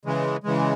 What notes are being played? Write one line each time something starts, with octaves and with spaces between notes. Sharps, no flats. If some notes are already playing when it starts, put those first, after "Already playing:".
C#3 E3 G#3
C#3 E3 G#3